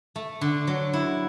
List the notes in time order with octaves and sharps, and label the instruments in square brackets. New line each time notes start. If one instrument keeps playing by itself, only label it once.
[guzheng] A3
D3
F#3
E4